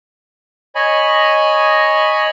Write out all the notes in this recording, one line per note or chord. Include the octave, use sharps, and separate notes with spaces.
C#5 D#5 G#5 B5